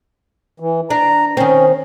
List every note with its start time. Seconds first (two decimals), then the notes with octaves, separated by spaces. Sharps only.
0.60 E3
0.90 D4 A#5
1.37 D#3 C4 C#4